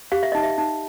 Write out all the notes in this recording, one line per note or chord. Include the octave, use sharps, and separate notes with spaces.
G4 F5
E5
D#4 D#5
E5
D#4